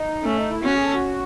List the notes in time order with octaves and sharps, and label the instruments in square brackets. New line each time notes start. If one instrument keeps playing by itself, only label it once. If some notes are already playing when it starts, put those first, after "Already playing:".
Already playing: [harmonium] D#4
[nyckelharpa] A3 [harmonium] C#4
[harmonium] D#4
E4
[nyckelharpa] C#4 [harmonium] F#4
[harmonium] G#4
A4
F#4